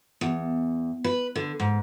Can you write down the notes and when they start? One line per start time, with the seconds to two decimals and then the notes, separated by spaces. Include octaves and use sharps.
0.21 E2
1.04 B4
1.35 D3
1.60 G#2